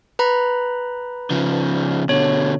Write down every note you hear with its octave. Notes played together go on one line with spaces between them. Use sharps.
B4 A#5 B5
C#3 F3
B2 D3 C#5